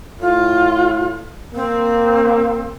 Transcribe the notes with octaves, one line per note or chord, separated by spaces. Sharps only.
A2 F4
A#3 C4